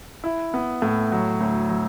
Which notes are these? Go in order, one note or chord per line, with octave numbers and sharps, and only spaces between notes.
E4
B3
A2
F#3
D2
F#3